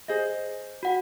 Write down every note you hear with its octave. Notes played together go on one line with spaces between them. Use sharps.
G#4 C5 D#5
F#4 F#5 G5